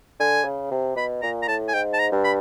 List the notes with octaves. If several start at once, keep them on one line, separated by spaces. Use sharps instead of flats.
D3 G#5
C#3
C3
B2 B5
A#2 A#5
A#5
A2 A5
G#5
G#2 G5
A5
A#5
G2
B5